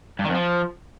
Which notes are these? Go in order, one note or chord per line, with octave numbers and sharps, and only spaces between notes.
G2
D#3
F2
F3